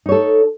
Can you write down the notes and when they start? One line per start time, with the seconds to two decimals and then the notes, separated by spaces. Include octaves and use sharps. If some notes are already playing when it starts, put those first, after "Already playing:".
0.06 D#4
0.09 C#5
0.12 A4